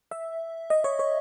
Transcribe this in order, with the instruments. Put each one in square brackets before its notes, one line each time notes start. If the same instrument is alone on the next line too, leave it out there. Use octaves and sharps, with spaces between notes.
[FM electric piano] E5
D#5
C#5
C#5